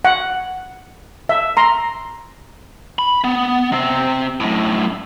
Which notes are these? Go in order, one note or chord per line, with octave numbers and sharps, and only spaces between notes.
F#5
E5
A#5 C6
B5
B3
C3 C4
F#2 A2